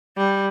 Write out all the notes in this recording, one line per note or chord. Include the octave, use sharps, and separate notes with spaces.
G3